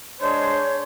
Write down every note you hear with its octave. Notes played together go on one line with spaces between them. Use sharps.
G#3 D4 C5 C#5